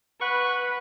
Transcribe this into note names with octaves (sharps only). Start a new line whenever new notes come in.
B4 F#5 C#6 F#6